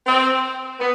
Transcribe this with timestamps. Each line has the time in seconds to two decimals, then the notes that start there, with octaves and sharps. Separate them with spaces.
0.05 C4
0.79 B3